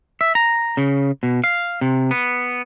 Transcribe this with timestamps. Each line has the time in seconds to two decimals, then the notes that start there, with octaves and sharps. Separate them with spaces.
0.21 E5
0.35 A#5
0.77 C#3
1.23 B2
1.44 F5
1.81 C3
2.11 B3